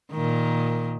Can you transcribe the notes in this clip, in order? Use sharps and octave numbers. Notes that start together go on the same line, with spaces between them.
A#2 D#3